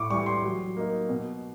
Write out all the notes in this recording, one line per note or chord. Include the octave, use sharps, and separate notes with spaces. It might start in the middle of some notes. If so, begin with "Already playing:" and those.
Already playing: A2 C#6 D6
E3 G3 C#6
C6
F#3
A#3 D#4
B2